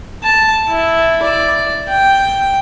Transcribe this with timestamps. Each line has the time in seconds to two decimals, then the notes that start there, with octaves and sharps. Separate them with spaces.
0.23 A5
0.69 E4
1.23 D5
1.89 G5